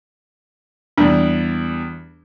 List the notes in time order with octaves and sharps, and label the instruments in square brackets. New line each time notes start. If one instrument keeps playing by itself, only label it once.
[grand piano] E2 G3 [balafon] D4